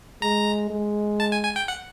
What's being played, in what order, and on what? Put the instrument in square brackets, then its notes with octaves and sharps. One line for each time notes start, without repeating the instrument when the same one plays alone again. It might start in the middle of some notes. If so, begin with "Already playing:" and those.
[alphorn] G#3 [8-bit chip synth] A#5
[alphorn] G#3
[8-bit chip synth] A5
G#5
G#5
G5
F#5